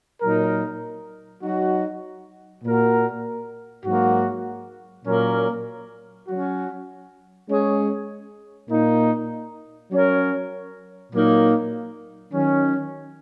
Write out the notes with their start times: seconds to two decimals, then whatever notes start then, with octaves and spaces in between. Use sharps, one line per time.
0.22 A#2 F#3 D#4 A#4
1.43 F#3 D#4 F#4
2.64 A#2 A#3 F#4 A#4
3.85 G#2 F#3 A#3 F#4
5.06 A#2 F#3 A#3 C#4 A#4
6.27 F#3 C#4 F#4
7.49 G#3 C#4 G#4 C#5
8.69 A#2 A#3 D#4
9.91 F#3 C#4 A#4 C#5
11.12 A#2 F#3 A#3 D#4
12.33 D#3 F#3 C#4